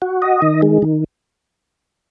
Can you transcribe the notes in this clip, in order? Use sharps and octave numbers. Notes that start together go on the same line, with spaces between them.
F#4
D#5
D#3
G#3
D#3